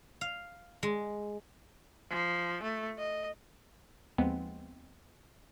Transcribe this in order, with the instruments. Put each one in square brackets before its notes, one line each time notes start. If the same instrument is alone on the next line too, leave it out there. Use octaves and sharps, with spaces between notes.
[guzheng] F5
G#3
[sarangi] F3
A3
D#5
[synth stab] D#2 F3 G#3 B3 C4